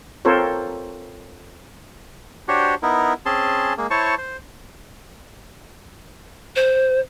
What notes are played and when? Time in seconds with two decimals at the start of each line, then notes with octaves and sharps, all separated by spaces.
0.25 C4 F4 A4 A#4 C5 C#5
2.48 D4 F#4 G4 C5 C#5
2.83 B3 D#4 E4 A#4
3.26 C4 C#4 G#4 A5 C6
3.78 G#3 A#3
3.90 E4 C5 C#5 A5 C#6
4.18 C5
6.56 C5